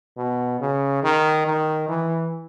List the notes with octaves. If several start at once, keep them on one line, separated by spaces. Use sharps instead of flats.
B2
C#3
D#3
D#3
E3